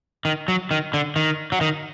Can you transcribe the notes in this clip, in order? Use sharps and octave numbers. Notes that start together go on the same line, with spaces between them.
D#3
F#3
D#3
D3
D#3
F#3
D#3